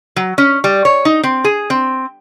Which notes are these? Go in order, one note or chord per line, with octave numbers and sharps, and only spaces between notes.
F#3
C#4
G3
C#5
D#4
C4
G#4
C4